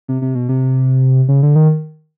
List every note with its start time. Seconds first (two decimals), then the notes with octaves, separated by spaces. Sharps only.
0.08 C3
0.22 C3
0.35 B2
0.49 C3
1.28 C#3
1.43 D3
1.55 D#3